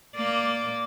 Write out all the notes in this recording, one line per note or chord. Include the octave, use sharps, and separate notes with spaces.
A#3 D5